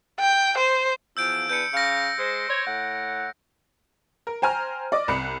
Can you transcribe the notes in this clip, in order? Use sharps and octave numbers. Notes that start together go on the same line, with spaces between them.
G5
C5
E2 F3 E6 G6 D7
E2 D4 B4 G6 C#7
C#3 F5 A#6 C#7
G#3 C5
C5 C#5
A2 F#5
A#4
C5 G5 G#5 A#5 F6
D5 D#5 D6
C2 B5 F#6 C#7